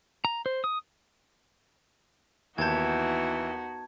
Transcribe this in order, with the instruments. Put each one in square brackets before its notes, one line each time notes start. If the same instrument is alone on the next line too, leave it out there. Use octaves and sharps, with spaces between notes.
[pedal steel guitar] A#5
C5
D#6
[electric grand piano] D#2 G6 [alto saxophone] E3 [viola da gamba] B3 D#4 F#4 [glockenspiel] A5 G#6